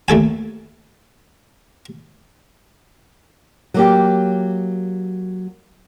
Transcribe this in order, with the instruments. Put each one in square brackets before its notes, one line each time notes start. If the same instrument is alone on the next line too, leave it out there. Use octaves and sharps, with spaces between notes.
[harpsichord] D#2 A3 A4 G#5
[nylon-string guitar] F#3 A#3 G4